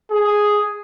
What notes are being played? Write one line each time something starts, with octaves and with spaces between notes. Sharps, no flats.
G#4